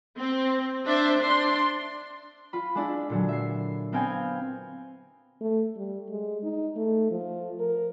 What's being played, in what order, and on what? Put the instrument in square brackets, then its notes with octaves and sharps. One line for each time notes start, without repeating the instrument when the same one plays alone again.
[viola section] C4
D4 C5 E5
D4 C6
[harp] F4 B5
G#3 D4 E4
A#2 D3 F#3
E5 C7
B3 C4 A#4 F5 G5 G#5
[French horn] A3
G3
G#3
D#4
A3
F3
A#4